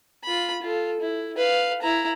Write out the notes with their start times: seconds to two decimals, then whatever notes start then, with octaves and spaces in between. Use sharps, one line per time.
0.24 F4 B5
0.62 F4 A4
1.00 E4
1.37 B4 F5
1.82 E4 A#5